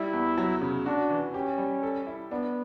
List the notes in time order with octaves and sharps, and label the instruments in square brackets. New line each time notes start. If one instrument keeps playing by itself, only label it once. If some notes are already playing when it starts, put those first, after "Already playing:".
Already playing: [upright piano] G3 [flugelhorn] E4
[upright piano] E2
F#3
C#3
[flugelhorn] D4 [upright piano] F#4
[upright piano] E3
[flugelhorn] C#4 [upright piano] G4
[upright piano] G3
A4
E4
[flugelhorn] B3 [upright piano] D4